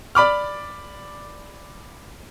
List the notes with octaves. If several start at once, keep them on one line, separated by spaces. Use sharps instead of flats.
D5 B5 D6 F6